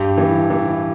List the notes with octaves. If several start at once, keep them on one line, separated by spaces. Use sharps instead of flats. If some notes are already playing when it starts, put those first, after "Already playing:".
Already playing: G2 G4
E3
E3